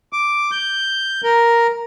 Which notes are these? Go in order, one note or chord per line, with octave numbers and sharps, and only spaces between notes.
D6
G6
A#4